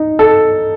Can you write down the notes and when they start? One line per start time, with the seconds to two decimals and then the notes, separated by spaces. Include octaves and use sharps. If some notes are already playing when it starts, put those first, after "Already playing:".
Already playing: D#4
0.19 A4